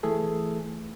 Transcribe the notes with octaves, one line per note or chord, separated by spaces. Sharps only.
E3 A3 G#4 A4